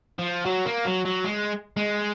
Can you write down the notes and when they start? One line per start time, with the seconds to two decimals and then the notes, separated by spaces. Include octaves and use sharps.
0.19 F3
0.45 F#3
0.65 A#3
0.85 F#3
1.05 F#3
1.24 G#3
1.77 G#3